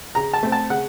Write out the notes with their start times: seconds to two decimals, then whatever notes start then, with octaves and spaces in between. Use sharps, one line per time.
0.15 C#3 A#5
0.34 A5
0.43 A3 C4
0.52 A5
0.70 C#3 F#5